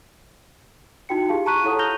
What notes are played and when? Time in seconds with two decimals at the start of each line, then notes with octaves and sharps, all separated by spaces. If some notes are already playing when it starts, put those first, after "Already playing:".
1.09 D#4 E4 F#4 G5 C#7
1.29 F4 G4 G#4 F5 A5
1.46 A5 A#5 C#6 F#6 B6 D#7
1.65 E4 A4 C#5 F#5 C#6 D#6
1.79 F6 G6 A#6 F7 G7